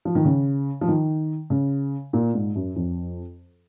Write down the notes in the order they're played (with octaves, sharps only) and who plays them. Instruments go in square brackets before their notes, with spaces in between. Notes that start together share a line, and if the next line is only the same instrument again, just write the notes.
[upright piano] F3
D#3
C#3
F3
D#3
C#3
A#2
G#2
F#2
F2